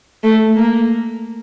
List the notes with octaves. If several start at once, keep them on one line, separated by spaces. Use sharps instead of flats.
A3
A#3